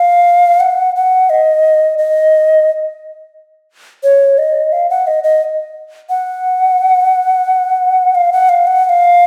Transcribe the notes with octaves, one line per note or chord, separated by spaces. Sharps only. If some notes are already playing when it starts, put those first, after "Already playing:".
Already playing: F5
F#5
F#5
D#5
D#5
C#5
D#5
F5
F#5
D#5
D#5
F#5
F5
F#5
F5
F#5
F#5
F5